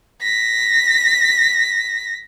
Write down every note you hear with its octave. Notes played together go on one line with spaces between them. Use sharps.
A#6 B6